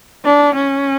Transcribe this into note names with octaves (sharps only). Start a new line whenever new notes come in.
D4
C#4